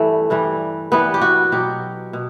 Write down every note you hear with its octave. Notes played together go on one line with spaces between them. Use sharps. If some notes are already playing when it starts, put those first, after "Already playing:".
Already playing: G2 E3 G3 A3
G2 E3 G3
G2 E3 G3 B3
G4
F#4
B2 F#3 G4
B2